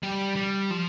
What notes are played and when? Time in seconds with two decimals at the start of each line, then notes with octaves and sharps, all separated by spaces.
0.03 G3
0.36 G3
0.71 F3